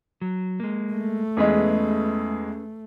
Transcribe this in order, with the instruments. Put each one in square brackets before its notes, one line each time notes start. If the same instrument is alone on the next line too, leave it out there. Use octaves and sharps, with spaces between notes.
[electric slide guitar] F#3
G#3 A#3
[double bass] A3
[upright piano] E2 G#3 [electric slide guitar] C#4 G#4 B4